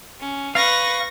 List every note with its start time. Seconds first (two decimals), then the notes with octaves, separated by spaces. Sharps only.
0.20 C#4
0.55 B4 F5 C#6 A#6